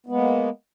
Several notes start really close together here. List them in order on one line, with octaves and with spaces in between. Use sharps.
B3 G#3 A#3